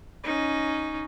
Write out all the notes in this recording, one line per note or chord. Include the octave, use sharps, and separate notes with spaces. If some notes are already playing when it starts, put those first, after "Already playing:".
C#4 D#4